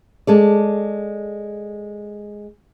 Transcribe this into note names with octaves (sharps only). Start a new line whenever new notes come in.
G#3 A4 D5